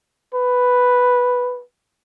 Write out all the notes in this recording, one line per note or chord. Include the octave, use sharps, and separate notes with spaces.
B4